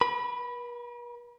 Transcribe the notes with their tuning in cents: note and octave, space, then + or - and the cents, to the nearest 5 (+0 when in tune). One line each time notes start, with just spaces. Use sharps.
B4 -45 B5 +0